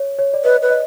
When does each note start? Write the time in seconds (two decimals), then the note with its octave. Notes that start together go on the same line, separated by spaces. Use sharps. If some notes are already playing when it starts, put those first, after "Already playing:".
Already playing: C#5
0.19 C#5
0.34 D5
0.44 B4 D#5
0.62 B4
0.70 D#5